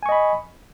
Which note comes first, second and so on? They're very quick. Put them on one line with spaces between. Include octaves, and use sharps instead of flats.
G#5 C#6 D#5 B5